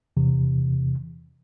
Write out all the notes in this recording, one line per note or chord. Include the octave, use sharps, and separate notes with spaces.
E2 C3 E3